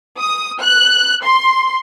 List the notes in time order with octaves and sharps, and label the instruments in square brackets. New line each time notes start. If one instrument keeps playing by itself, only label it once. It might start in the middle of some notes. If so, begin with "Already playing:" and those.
[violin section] D#6
F#6
C6